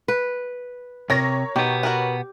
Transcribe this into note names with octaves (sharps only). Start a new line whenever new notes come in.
B4
C3 A#4 C#5 A#6
B2 D#3 B3 G4
F#4 A#4 B4